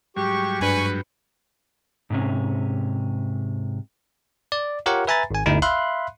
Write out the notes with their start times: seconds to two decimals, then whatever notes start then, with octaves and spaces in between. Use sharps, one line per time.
0.17 G#2 F#3 G3 G4 C#6
0.61 G2 D4 B4 G#5 C#6 C#7
2.10 G#2 C3 C#4
4.52 D5
4.86 F4 G4 A#4 C#5 F#5
5.07 B4 E5 G#5 A#5 B5 A6
5.31 G#1 G#5
5.46 G1 D2 D#4 E4
5.62 E5 F5 B5 C6 F#6